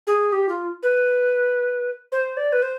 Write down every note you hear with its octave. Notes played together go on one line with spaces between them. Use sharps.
G#4
G4
F4
B4
C5
D5
B4
C5